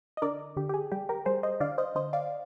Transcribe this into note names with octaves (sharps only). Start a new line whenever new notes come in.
D#5
D3 A#4 D5
D3 G4
G4
G#4
G3 G4
G4 A#4
G3 G#4 C5
C5 D#5
D3 D5 F5
C5 D#5
D3 C5 D#5
D5 F5